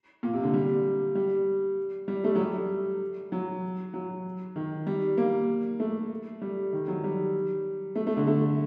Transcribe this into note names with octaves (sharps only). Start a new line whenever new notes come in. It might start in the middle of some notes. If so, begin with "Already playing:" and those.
A#2
C3
D3
G3
G3
G3
A3
F#3
G3
F#3
F#3
D#3
G3
A#3
A3
G3
D#3
F#3
G3
A3
A3
D3
A3